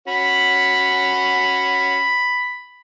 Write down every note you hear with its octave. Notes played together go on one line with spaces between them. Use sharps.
C#4 F#4 B5